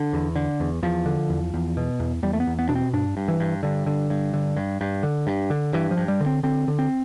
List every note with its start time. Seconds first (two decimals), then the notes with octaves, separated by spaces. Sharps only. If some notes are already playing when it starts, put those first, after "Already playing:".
Already playing: D3
0.13 E2
0.36 D3
0.60 E2
0.83 E2 F3
1.06 D3
1.30 E2
1.54 E2
1.77 B2
2.00 E2
2.23 E2 G3
2.33 A3
2.40 B3
2.47 E2
2.59 B3
2.69 B2 D4
2.75 C4
2.93 G2 D4
3.17 G2
3.28 E3
3.40 G2
3.63 G2 D3
3.87 D3
4.10 G2
4.34 D3
4.57 G2
4.81 G2
5.03 D3
5.27 G2
5.50 D3
5.73 G2 E3
5.91 F3
5.97 G2
6.08 G3
6.21 D3
6.26 C4
6.43 D3 C4
6.68 D3
6.79 C4